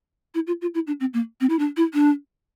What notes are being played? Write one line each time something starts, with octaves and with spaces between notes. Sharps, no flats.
E4
F4
F4
E4
D4
C4
A#3
C4
E4
D4
E4
D4